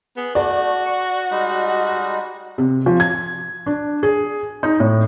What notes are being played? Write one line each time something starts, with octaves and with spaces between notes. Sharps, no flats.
B3 G#4
A3 F#4 D5
C#6
G3 G#3 D#4
C3
F3
G#6
D4
G#4
D#4
A2